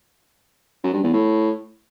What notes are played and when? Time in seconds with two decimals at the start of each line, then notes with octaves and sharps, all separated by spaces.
0.84 F#2
0.93 G2
1.03 E2
1.13 A2